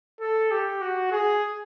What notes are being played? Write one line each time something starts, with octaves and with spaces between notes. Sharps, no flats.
A4
G4
F#4
G#4